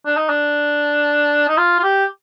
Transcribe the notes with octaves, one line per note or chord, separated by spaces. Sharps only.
D4
D#4
D4
D#4
F4
F4
G4